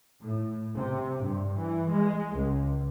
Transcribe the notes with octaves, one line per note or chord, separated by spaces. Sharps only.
A2
C3
G2
E3
G#3
C#2